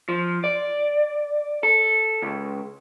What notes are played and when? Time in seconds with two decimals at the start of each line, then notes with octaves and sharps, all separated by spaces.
0.09 F3
0.44 D5
1.63 A4
2.22 C#2